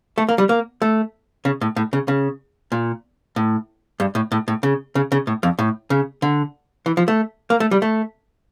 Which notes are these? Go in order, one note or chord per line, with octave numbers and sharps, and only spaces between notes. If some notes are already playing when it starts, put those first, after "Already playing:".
A3
A#3
G3
A#3
A3
C#3
A2
A2
C#3
C#3
A#2
A2
G2
A2
A2
A2
C#3
C#3
C#3
A2
F2
A2
C#3
D3
E3
F3
A3
A#3
A3
G3
A3